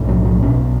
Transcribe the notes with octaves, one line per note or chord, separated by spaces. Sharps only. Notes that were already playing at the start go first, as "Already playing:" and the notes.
Already playing: B1 A2
F#3
F#3
B1 B2 C#4